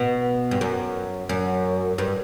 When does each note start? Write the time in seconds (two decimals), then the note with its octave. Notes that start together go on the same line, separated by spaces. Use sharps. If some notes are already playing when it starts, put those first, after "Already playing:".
Already playing: B2
0.51 G2
0.61 F#2
1.29 F#2
1.98 G2